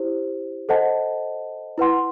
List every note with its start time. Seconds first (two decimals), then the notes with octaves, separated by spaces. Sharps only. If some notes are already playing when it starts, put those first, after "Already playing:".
Already playing: E4 G4 C5
0.69 A4 C5 D#5 F#5 A5
1.78 E4 B4 F#5 C6